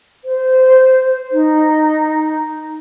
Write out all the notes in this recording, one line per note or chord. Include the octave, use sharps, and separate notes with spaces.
C5
D#4